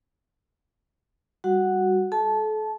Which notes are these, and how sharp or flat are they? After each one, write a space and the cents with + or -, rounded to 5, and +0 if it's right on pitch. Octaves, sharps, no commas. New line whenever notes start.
G3 +0 F#4 +0 F#5 +0
A4 -35 A5 -15